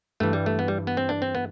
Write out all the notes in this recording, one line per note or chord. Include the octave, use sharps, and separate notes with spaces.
G2 E3 A3
G3
A3
B3
G3
B3
C4
D4
C4
B3